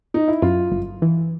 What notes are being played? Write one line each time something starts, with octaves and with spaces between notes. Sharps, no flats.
D#4
E4
F#2 F4
G1
E3